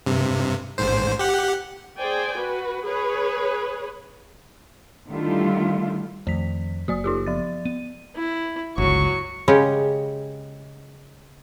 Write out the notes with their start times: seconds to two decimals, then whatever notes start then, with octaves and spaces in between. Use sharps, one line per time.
0.06 G2 C3
0.78 A1 G#2 C5
1.19 G4 F#5
1.98 G#4 C5 D5 G5 G#5
2.37 F#4 B4
2.84 G#4 B4 C#5
5.08 D3 D#3 G3 A3 E4 F4
6.27 F2 D#3 B6
6.88 F#1 F#3 A#3 F#4 D5 D#6
7.04 D#4 F4 G4
7.26 F3 A6
7.65 B3 D#7
8.16 E4
8.78 G1 C#2 F#3 C#6
9.48 C#3 G#3 C#4 G4